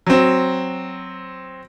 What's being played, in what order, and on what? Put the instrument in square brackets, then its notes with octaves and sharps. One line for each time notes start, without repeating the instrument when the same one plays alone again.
[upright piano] F#3 C4